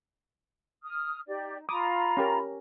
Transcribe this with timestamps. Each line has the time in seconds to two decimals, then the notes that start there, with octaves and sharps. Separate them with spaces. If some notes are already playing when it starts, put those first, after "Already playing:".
0.84 D#6 F6
1.27 D#4 G4 D5
1.69 F4 A#5 B5 D6 D#6
2.17 C#4 G4 A#4